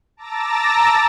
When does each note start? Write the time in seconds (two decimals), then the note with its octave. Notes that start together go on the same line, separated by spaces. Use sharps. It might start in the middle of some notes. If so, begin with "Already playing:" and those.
0.17 A5 A#5 D6 E6 A6 A#6